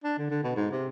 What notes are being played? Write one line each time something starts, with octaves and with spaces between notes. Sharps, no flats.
D4
D3
D3
B2
G#2
C3